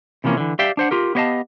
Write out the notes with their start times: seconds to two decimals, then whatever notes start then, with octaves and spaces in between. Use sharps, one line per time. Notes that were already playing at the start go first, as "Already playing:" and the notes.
0.24 C3 E3 F3 A#3 C#4
0.37 D3 E3
0.59 G4 D5 E5 F5 G5
0.77 D4 C5 F#5
0.91 F4 G4 A#4
1.15 B3 G4 C#5 D#5 F5 A5